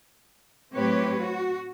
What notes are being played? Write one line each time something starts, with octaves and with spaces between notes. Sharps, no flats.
A2 F#3 C4 G4 B4 C#5
F#4